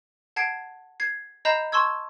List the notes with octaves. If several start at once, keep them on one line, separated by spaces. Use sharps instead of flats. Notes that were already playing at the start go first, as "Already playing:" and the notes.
F#5 A5 G#6 C7 D7
G#6 C7
D#5 A#5 B5 G6 C7 E7
A5 C6 C#6 E6 G#6